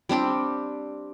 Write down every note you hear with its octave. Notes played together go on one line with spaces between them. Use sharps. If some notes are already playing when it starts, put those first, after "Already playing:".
G3 C4 D4 G4